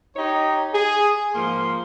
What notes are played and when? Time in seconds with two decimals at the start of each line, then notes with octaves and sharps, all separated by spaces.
0.16 D#4 G4 C#5
0.72 G#4
1.34 G#2 F3 A#3 C6